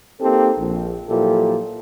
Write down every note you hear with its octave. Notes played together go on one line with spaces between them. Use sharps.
A#3 C4 D#4 G4 A4
A#1
A#2 F3 F#3 E4 G4 A4